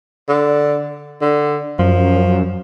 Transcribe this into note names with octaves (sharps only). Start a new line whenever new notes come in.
D3
D3
F#2 F3